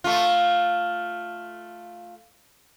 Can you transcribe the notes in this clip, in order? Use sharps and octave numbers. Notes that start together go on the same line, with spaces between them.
A3 F4